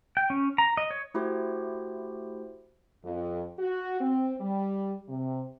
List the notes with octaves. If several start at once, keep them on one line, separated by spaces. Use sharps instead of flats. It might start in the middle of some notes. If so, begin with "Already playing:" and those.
G5
C#4
A#5
D#5
C#5
A3 E4 F#4 G4 C5
F2
F#4
C4
G3
C3